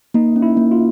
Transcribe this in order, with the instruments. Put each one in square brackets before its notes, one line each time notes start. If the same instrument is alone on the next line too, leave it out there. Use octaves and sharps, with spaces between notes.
[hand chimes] A#3 [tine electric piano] D#4
[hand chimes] C#4
[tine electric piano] E4
[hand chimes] A#3
[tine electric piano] F4